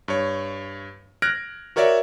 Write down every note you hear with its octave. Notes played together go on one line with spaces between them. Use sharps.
G2 C#5
F6 F#6 G#6 A#6 D7
F#4 A#4 C#5 D5 E5